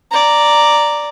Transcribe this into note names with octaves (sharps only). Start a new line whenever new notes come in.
D5 A#5